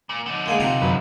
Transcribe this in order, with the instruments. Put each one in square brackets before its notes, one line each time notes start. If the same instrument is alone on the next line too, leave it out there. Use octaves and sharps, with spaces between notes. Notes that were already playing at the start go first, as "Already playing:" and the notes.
[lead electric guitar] A#2
D3 D#4
[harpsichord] G#3 A#3 G#4
[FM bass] C3 [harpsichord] F4 G4 A#5
[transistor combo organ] F#2 B4